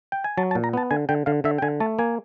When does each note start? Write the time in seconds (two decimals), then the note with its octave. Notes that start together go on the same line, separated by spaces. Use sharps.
0.12 G5
0.24 G#5
0.38 F#3 A5
0.51 A5
0.55 A#2
0.64 A#5
0.73 B3 A5
0.91 D3 G#5
1.09 D3 G5
1.26 D3 F5
1.44 D3 E5
1.58 G5
1.62 D3 G#5
1.80 A3 A5
1.99 A#3 G#5